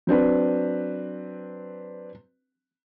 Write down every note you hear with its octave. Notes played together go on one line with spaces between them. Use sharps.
F#3 C4 D4 B4